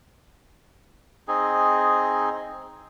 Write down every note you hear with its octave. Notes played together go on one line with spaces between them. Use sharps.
C4 D#4 G#4